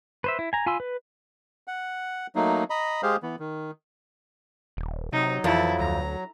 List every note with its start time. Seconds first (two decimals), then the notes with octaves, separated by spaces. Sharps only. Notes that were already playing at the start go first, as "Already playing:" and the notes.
0.24 B4 C5 E5
0.39 E4
0.53 G#5 A#5
0.66 F4 G#5 B5 C6 E6
0.80 B4
1.68 F#5
2.35 F#3 A3 A#3 D#4
2.70 D#5 A#5 B5
3.03 G#3 G4 G#4 C5 F5
3.23 E3 B3
3.39 D#3
4.77 D#1
5.13 C3 F#3 D#4
5.44 F2 E3 E4 A5
5.79 D2 A#5